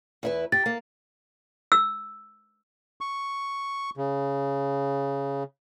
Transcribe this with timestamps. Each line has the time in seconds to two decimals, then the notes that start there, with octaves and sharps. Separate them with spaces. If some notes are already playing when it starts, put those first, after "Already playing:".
0.23 E2 E4 B4
0.52 G4 A6
0.66 A#3
1.72 E6
3.01 C#6
3.97 C#3